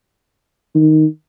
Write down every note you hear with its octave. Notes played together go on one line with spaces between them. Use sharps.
D#3